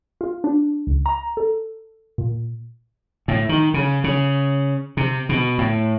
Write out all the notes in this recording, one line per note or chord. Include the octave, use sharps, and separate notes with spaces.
F4
D4
C#2
A#5
A4
A#2
A2
D#3
C#3
C#3
C3
B2
A2